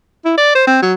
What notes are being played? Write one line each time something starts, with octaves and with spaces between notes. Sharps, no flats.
E4
D5
C5
C4
F#3